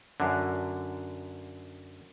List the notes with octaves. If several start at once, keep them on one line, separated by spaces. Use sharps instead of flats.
F#2 D3